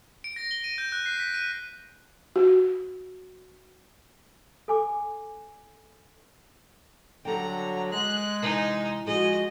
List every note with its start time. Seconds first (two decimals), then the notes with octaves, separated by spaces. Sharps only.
0.24 D7
0.36 A#6
0.51 G7
0.64 D#7
0.78 G6
0.92 F#6
1.06 C7
1.20 B6
1.34 D#7
2.36 F#4
4.68 A4 G#5 D6
7.25 D3 F#3 G3 A4 G5 A#5
7.92 G#3 F#6
8.42 C3 E3 D#4 D#6
9.06 F3 G#3 F#4 G#4 D#5